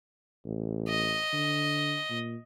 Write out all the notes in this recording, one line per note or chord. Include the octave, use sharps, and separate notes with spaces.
A1
D#5
D3
A#2